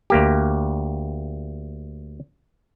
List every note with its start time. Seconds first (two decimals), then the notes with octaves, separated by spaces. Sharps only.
0.10 D2 A#3 G4